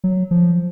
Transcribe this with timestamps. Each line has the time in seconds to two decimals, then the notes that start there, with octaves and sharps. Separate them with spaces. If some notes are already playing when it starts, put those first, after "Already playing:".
0.04 F#3
0.31 F3